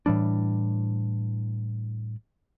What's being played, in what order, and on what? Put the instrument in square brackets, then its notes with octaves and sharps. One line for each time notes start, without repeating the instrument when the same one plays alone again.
[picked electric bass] A2 E3 G3 D4